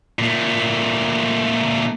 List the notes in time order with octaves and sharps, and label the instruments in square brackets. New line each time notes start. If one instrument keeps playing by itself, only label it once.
[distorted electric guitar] A#2 A3